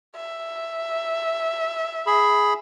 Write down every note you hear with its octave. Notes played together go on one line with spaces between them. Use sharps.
E5
G#4 B5